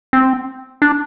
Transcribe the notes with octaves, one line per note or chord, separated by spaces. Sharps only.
C4
D4